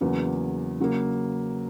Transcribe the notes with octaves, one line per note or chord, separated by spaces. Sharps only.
E2 C#3 F#3 A#3
C#3 F#3 A#3